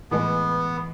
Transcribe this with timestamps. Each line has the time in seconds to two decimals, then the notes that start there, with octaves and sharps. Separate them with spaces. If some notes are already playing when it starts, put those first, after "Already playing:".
0.11 A2 E3 G#3 B3